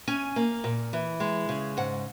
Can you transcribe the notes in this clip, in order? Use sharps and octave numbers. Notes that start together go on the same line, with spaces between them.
C#4 G#5
A#3
A#2
E3
G#3
C#3
G#2 F#5